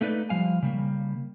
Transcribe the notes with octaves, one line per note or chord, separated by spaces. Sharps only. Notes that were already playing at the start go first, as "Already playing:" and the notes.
A3 A#3 D#4 B4 D5
F3 G3 F5 G#5
C#3 G3 A#3